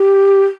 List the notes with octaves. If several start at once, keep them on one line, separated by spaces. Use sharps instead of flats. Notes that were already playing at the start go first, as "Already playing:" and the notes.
Already playing: G4